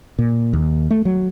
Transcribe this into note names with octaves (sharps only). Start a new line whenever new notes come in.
A#2
D#2
A3
F#3